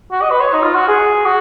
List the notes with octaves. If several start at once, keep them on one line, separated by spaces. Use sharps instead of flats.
F#4
D#5
B4
C#5
D#4
F4
F#4
G#4
F#4